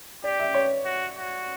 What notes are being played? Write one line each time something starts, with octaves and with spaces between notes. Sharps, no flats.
G4 D5
E5
C#5
F#4
F#4